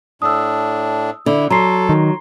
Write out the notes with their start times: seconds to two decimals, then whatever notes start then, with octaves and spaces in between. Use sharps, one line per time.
0.22 A2 D4 D#6 E6
1.26 D3 E4
1.50 F#3 A4 A#5 C6 C7
1.89 D#3